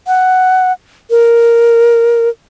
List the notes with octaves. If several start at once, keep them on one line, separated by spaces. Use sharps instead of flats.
F#5
A#4